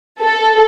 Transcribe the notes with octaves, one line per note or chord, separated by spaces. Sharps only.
A4